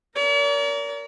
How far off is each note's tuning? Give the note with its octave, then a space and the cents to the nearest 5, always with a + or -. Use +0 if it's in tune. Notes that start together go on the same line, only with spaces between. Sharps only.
A#4 +0 D5 -45